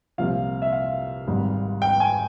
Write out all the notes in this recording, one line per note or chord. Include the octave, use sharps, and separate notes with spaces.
C2 A#2 F3 F5
E5
F5
G#1 G#2 G3
G5
G#5